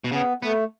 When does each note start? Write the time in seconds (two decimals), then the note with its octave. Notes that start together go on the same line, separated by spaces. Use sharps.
0.04 B2
0.12 C#3 B3
0.42 A3 B3